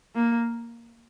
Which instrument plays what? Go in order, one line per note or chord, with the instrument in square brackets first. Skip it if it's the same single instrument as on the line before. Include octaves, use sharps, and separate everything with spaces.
[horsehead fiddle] A#3